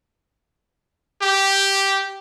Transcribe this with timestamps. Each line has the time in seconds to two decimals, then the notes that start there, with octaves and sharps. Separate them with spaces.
1.22 G4